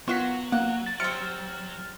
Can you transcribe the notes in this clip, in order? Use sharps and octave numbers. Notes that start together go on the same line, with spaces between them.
D#3 F#3 B3 F4 F#4 C6 B6
A#3 F#5
A6
C3 C4 F6 A6 C#7